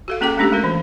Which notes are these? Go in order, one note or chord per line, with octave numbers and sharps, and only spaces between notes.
F#4 A4 F5
A#3 C#4 G#4 A4 G5 D6
G#3 A3 C#4 D4 G4
G#3 F#4 A#4
E3